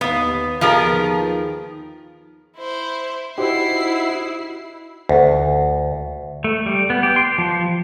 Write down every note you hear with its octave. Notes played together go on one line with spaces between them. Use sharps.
D#2 B3 F5
D#2 D#3 F3 B3 G#4 A#4
E4 C5
D#4 E4 F#4 G4 C5 C7
D2
A3
G3
B3
G4
C6
F3